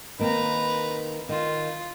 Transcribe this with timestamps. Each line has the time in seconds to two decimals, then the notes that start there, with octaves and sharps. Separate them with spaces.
0.19 D#3 A#3 C4 B4 A#5
1.29 D#3 F4